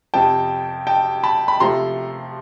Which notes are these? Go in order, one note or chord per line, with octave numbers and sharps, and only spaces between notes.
F2 C3 F3 G5 A5
G5 A5
A5 B5
B5
C3 F3 A3 A#5 C6